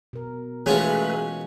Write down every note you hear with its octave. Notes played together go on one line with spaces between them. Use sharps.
B2 A#4
E3 G#3 A3 C#4 F4 F#4 G#4 B4